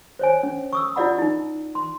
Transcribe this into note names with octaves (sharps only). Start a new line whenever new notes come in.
C5 C#5 G#5
C#4
C#6 D#6 E6
E4 F4 D5 D#5 F#5 B5
D#4 E4
C6